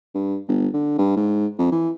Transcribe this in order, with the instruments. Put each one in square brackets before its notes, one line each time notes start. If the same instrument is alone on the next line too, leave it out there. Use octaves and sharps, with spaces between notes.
[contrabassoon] G2
G1
D3
G2
G#2
F2
E3